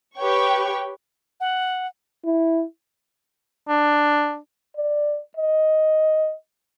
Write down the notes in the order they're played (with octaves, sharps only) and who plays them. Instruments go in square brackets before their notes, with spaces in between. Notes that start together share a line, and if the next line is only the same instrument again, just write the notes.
[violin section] G4 B4 C#5 G5 C#6
[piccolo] F#5
[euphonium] E4
[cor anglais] D4
[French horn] D5
D#5